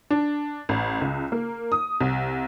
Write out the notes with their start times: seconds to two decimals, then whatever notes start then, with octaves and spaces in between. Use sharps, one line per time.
0.11 D4
0.69 A1
1.01 C#2
1.32 A#3
1.72 D#6
2.01 C2